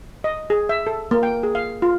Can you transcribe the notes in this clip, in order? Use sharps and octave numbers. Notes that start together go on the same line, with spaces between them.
D#5
G#4
E5
A4
A#3
G5
G#4
F5
F4